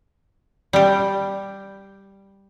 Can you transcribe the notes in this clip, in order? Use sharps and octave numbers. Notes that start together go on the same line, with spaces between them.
G3 G4